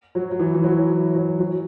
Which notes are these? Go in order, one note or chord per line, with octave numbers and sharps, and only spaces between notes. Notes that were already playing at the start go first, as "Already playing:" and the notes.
F#3
F#3
E3
E3
F#3
E3
F#3
F#3